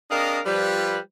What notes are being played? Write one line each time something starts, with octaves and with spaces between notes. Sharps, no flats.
C4 D4 G#4 A#4 D#5 F5
F3 G3 B4